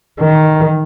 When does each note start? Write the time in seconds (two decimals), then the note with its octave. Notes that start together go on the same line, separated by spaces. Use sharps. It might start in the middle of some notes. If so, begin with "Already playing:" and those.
0.20 D#3